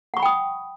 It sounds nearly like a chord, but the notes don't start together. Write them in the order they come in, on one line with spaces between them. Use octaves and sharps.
F#5 C#6 B5 G5 D#6